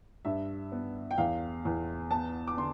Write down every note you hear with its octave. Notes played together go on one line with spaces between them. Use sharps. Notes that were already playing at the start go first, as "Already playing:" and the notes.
G2 E5
B3
G5
E2 F5
E2
B3 A5
D6
D3 C6